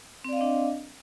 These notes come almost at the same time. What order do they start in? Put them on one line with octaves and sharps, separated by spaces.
C4 D5 F5 D#5 D4